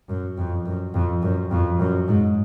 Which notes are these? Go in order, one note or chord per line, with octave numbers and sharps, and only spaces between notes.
F#2
F2
F#2
F2
F#2
F2
F#2
G#2